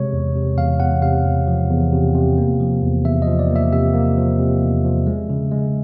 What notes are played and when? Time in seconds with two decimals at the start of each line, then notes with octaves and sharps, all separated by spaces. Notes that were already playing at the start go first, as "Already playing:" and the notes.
Already playing: C3 G#3 C#5
0.13 E2
0.35 C3
0.57 E2 F5
0.80 E2 F#5
1.02 C3 F5
1.26 E2
1.47 F3
1.70 E2
1.93 C3
2.15 C3
2.38 A#3
2.60 F3
2.82 E2
3.05 E2 E5
3.22 D#5
3.27 F3
3.39 D5
3.50 A#3
3.56 E5
3.72 C3 E5
3.94 A#3
4.18 F3
4.40 C3
4.62 E2
4.85 F3
5.07 G#3
5.30 C#3
5.51 G#3